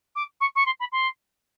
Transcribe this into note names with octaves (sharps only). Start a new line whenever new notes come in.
D6
C#6
C#6
C6
B5
C6